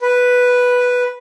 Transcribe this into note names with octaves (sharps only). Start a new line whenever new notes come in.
B4